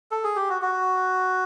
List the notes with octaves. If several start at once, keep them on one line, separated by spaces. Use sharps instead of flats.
A4
G#4
G4
F#4
F#4